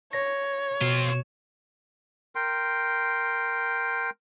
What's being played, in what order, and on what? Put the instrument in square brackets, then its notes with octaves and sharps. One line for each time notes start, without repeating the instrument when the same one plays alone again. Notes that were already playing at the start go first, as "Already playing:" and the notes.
[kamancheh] C#5 [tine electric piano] A#6
[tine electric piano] B2 [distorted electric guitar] C4 F4
[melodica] A#4 G5 C6